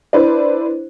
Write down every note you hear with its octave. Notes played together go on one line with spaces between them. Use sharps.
D4 E4 B4 C5